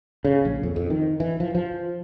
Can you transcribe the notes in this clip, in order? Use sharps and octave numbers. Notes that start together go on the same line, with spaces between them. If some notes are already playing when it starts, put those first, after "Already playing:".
C#3
A#1
F2
F2
D#3
E3
F3
F3